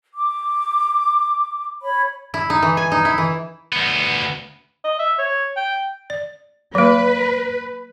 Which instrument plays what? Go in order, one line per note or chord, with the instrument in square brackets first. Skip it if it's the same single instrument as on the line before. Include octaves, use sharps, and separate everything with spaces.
[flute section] D6
C#5 B5
[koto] E4
D#4
E3
G#5
D#4
E4
E3
[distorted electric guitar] D2 B3
[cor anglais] D#5
E5
C#5
G5
[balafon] D5
[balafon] F#3 A#3 [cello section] B4